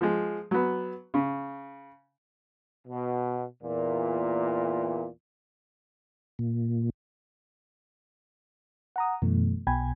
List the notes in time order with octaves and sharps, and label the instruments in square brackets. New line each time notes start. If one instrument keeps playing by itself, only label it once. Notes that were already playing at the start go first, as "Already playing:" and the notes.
[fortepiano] F3 G#3
F#3 B3
C#3
[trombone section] B2
E2 A#2
[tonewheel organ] A#2
[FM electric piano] F#5 A#5 D#6
F#2 B2 E3 A3
B1 B2 G5 G#5 B5 G#6